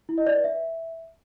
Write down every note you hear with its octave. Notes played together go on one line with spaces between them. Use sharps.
E4
D#5
D5
B4
E5